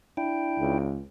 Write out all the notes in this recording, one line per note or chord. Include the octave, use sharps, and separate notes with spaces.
D4 E4 G5
C#2